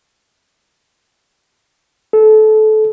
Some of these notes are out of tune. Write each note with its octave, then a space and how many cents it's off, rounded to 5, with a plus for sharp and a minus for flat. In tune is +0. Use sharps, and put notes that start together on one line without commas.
A4 -25